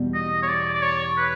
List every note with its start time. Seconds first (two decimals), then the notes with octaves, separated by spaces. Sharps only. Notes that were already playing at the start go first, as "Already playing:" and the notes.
Already playing: E2 B2 G3
0.14 D#5
0.42 C#5
0.48 D5
0.75 D5
0.82 C#5
1.17 B4